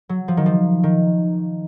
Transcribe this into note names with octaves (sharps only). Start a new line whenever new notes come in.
F#3
F3
D#3
F3
D#3